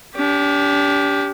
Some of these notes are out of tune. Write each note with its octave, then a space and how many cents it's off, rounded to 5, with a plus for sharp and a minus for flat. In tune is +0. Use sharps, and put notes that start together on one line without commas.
D4 -40 G4 +0